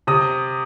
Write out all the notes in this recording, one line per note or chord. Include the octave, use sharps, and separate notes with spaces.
C3 D#6